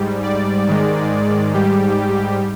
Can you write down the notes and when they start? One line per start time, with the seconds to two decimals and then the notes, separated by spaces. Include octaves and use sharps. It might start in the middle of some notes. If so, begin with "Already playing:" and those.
Already playing: G#2 G3
0.23 D5
0.67 G#2 D#3 G#3
1.54 G#2 G3 G4